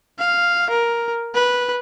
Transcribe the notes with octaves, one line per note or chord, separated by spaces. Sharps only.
F5
A#4
B4